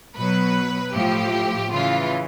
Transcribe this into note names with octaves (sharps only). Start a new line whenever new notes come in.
B2 F#3 B4
A2 F3 G4
C#3 E3 F4